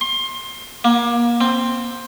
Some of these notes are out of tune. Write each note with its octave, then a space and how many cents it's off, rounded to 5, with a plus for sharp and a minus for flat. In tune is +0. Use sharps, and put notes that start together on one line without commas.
C6 +25
A#3 +30
C4 +5